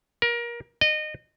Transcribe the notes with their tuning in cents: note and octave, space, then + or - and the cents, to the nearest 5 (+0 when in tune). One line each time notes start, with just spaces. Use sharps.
A#4 +25
D#5 -25